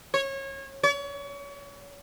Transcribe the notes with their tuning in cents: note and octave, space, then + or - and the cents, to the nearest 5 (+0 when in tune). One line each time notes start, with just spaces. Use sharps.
C#5 -25
C#5 +35